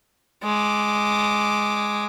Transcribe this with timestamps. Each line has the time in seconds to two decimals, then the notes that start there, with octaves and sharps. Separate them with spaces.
0.43 G#3 D6